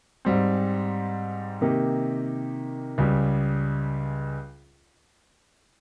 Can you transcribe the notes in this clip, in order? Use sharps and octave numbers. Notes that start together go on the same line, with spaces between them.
G#2 G3 C4
C3 D#3 A#3 D#4 G4
C#2 C#3 G3